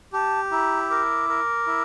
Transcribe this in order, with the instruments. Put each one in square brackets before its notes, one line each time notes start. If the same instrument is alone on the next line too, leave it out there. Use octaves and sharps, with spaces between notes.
[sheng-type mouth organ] G4 [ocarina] A5
[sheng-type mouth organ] E4 [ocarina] A#5
[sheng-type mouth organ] A#4 [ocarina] D6
[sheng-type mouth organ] A#4
E4